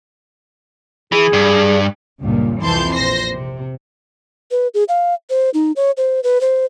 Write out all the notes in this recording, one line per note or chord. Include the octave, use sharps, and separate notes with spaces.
E3 G#4
G2
C#2 G2 A#2
C2 F2 E3 A5 C6 G6
A#1 C5 A#6 C7
C3
B4
G#4
F5
C5
D#4
C#5
C5
B4
C5